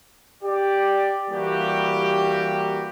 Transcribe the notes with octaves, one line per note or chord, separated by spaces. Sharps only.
G4 D5
E3 G3 A#3 F#4 G4